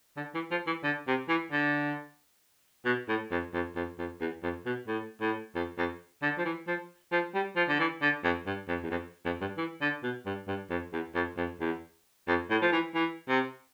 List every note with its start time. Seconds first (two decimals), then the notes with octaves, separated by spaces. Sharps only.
0.17 D3
0.34 E3
0.51 F3
0.67 E3
0.84 D3
1.07 C3
1.28 E3
1.52 D3
2.85 B2
3.08 A2
3.31 F2
3.54 F2
3.75 F2
3.98 F2
4.21 E2
4.43 F2
4.66 B2
4.87 A2
5.21 A2
5.55 F2
5.78 F2
6.22 D3
6.38 F3
6.45 E3
6.67 F3
7.12 F3
7.34 G3
7.56 F3
7.69 D3
7.79 E3
8.01 D3
8.24 F2
8.46 G2
8.68 F2
8.83 E2
8.91 F2
9.25 F2
9.41 G2
9.58 E3
9.81 D3
10.03 B2
10.26 G2
10.48 G2
10.70 F2
10.93 E2
11.15 F2
11.37 F2
11.61 E2
12.28 F2
12.50 A2
12.62 F3
12.72 E3
12.94 E3
13.29 C3